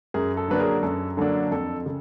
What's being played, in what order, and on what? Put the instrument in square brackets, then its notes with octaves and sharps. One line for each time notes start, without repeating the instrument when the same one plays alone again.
[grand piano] F#2 G#4 A#4
A4
D3 F#3 A#3 D4 B4
G#4 A#4
F#2 A4
D3 F#3 A#3 D4 A4
F2 A4
C#3